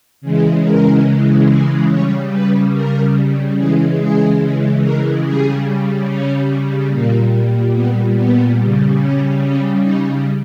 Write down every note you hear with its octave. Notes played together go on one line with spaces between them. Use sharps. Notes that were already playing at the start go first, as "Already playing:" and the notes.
C#3 E3 G#3
A#4
G#4
C#3 G3 C#5
B4
A#4
C#3 E3 G#3 G#4
G#4
A#4
C#3 G3 G#4
C#4
A#2 G3 A#3
B3
B3
C#3 G3
C#4
C#4
D#4